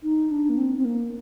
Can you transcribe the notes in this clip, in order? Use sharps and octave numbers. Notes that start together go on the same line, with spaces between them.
D#4
D4
A#3
C4
C4
A#3